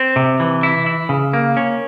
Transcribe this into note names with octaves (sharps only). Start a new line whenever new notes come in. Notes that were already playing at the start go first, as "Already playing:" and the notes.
Already playing: C4
C3
E3
E4
E4
C#3
A#3
C#4